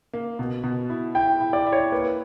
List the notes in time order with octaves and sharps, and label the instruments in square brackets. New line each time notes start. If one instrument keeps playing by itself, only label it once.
[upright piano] A#3
B2
B2
E4
[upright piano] E4 [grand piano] G5
[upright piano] E4
[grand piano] D5
[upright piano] E4
[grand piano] C#5
[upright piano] A#3 [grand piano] B4